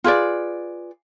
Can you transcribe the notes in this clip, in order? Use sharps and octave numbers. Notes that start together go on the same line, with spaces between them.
F4 G#4 B4 D5